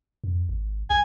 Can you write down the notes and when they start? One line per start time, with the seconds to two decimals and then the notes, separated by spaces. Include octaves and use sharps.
0.24 F2
0.49 G#1
0.90 B1 G#5